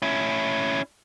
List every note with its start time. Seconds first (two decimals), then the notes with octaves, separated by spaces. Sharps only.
0.02 C#4 E4